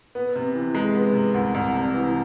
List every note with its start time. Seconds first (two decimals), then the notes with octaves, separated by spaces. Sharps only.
0.15 B3
0.36 C3
0.55 E3
0.75 G#3
0.94 B3
1.14 C3
1.34 C2
1.54 C2
1.74 C3
1.94 E3